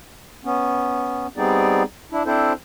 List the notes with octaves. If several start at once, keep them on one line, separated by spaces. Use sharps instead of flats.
B3 C#4
G3 B3 C4 D#4 G#4 D5
D4 E4
C4 D4 E4 A4 C5